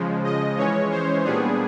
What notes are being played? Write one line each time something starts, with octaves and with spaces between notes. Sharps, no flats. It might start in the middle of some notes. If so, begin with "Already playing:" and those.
Already playing: C#3 F3 G#3
D#5
E3 G#3 C#4 C#5
C5
A#2 G3 B3 D4 G#4